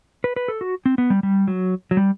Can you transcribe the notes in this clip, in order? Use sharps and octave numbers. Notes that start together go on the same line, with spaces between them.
B4
B4
A4
F#4
C4
B3
G3
G3
F#3
F#3
G3